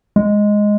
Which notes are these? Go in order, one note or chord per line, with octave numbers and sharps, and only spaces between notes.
G#3